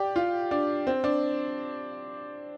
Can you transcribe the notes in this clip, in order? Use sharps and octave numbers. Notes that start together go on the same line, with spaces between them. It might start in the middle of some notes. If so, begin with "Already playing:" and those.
Already playing: G4 D5
F4
D4
C4
D4